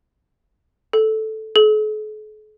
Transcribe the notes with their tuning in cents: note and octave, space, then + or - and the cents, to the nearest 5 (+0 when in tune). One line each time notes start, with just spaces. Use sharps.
A4 -5
A4 -45